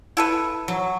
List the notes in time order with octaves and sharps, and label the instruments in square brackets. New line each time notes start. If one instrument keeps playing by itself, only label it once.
[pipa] E4 A4 B4
[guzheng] F#3